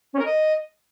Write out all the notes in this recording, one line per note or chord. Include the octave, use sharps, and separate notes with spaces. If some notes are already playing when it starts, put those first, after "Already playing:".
C#4
A#4
D#5